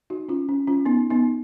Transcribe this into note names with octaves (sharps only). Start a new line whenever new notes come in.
D#4 F#4
C#4 F4
C#4
C#4 F4
B3 D#4
B3 D#4